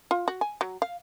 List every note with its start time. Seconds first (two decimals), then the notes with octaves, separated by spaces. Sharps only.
0.11 F4
0.28 F#4
0.41 G#5
0.61 F#3
0.82 F5